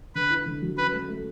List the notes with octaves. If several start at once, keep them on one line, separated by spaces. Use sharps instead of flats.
D3 B4
E4
D3
F#3
C#4 B4
A3
A3